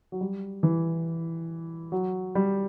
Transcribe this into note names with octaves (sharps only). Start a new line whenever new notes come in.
F#3
G3
E3
F#3
G3